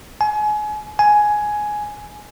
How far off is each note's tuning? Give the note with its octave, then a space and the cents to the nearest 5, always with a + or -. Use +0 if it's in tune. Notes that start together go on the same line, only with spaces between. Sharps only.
G#5 +30
G#5 +10